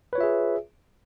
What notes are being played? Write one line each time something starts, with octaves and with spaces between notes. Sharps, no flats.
F4 G#4 B4 C#5 E5